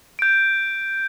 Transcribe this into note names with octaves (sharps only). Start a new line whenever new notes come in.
G6 D7